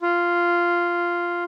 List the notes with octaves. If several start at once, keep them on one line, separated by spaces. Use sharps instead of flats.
F4